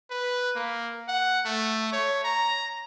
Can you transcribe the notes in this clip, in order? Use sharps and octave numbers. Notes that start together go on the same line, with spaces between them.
B4
A#3
F#5
A3
C#5
A#5